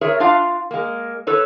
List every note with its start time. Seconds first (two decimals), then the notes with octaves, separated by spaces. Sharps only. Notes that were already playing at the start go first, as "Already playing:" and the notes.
0.01 G#4 A#4 C#5 E5
0.20 D4 F4 F5
0.71 G#3 A#3
1.27 A4 B4 C#5